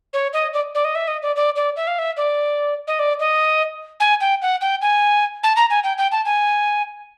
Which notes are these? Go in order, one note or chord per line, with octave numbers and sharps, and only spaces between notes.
C#5
D#5
D5
D5
D#5
E5
D#5
D5
D5
D5
E5
F5
E5
D5
D#5
D5
D#5
G#5
G5
F#5
G5
G#5
A5
A#5
G#5
G5
G5
A5
G#5